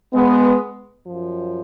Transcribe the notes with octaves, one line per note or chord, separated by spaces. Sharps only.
G#3 B3
F#2 F3